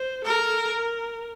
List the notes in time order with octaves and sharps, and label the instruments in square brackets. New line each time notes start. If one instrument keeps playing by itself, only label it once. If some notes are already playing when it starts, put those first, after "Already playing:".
Already playing: [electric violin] C5
[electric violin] A4 [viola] A#4
[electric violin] A#4